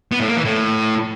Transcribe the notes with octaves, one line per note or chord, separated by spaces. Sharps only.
B3
A2
A#3
E3
A2